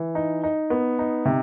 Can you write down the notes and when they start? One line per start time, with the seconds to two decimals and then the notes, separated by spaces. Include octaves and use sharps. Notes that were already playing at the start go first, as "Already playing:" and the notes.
Already playing: E3
0.15 D#4
0.44 D#4
0.70 B3
0.99 D#4
1.25 C3